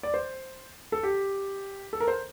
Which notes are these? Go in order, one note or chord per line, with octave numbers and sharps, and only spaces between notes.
D5
C5
A4
G4
A4
A#4
C5